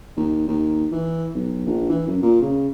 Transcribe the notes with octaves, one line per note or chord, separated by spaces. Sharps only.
D#2
D#2
E3
B1
A#1
E3
F#2
A#2
C#3